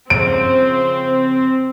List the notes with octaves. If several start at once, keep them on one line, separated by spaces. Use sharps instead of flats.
C#3 F3 C4 D7